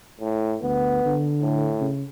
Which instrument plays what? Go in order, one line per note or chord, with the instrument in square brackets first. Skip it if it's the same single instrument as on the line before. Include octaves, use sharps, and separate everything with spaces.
[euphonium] A2
[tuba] D2 [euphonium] B3
[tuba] D3
[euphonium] A2
[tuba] C#3